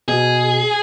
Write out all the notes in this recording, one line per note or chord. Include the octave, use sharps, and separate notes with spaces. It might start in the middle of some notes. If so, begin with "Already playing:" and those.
B2 G#4